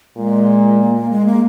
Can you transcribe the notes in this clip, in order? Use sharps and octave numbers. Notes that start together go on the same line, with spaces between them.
A#2 G#3
A#3
A#3
G#3
A#3